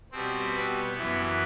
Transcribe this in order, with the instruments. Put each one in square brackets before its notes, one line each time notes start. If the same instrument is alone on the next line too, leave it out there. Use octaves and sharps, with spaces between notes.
[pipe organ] B2 G3 B3 C4
B3
F#2 E3 B3